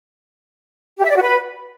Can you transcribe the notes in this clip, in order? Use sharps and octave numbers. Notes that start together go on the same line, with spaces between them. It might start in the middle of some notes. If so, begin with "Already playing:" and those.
G4
E5
D5
F#4
B4